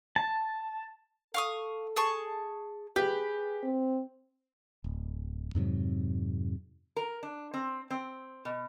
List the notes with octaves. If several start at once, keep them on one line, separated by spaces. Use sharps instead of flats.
A5
A4 F5 C#6 D#6
G#4 A5 C#6
G4 G#4 B4
C4
D1
F2 G#2 C3 F#3
A#4
D4
C4
C4
B2